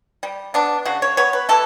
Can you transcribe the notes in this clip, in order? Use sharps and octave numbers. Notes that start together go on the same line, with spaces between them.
G3
B3 D4
C#3 F#4
C#5
B3 C#5
B4
E3 A4